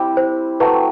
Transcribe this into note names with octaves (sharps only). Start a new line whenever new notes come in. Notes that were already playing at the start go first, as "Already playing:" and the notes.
Already playing: G3 C4 E4
C5
F#3 A3 C4 B4